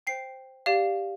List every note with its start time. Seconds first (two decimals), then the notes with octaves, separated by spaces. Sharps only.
0.07 C5 G5 C7
0.66 G4 D5 F5